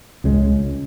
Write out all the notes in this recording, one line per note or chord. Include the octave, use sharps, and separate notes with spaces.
C#2 C#3 G#3